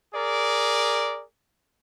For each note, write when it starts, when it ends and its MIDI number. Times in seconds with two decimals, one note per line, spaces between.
0.14 1.22 68
0.14 1.22 70
0.14 1.22 74